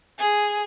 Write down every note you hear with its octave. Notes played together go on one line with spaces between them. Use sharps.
G#4